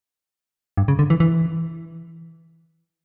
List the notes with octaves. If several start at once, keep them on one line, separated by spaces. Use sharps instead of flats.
G2
C#3
D3
E3
E3